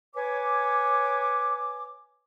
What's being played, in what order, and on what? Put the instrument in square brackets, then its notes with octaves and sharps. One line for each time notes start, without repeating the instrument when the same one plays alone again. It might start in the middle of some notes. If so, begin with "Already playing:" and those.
[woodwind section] B4 C#5 G#5 D6